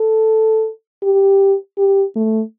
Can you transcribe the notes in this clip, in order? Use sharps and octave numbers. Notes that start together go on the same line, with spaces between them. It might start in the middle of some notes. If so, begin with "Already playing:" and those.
Already playing: A4
G4
G4
A3